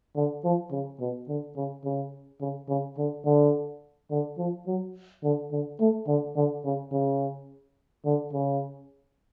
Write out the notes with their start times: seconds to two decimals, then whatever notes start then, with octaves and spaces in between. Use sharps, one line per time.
0.16 D3
0.44 F3
0.72 C#3
1.00 B2
1.28 D3
1.56 C#3
1.85 C#3
2.41 C#3
2.69 C#3
2.98 D3
3.25 D3
4.11 D3
4.38 F3
4.67 F#3
5.23 D3
5.52 D3
5.80 A3
6.07 D3
6.36 D3
6.65 C#3
6.92 C#3
8.05 D3
8.33 C#3